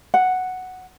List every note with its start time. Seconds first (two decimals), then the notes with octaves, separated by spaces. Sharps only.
0.14 F#5